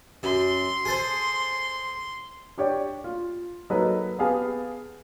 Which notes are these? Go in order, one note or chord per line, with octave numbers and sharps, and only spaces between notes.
F#2 C6
G#4 A4 C5
D4 G4 C#5 D5 G5
F4
F#3 A#3 D#4 A4 B4
B3 G4 G#4 F5 G#5 A5